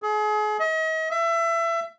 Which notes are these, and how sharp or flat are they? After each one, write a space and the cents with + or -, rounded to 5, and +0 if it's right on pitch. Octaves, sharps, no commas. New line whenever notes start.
G#4 +35
D#5 +40
E5 +25